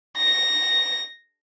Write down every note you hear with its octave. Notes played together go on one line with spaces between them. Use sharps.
A#6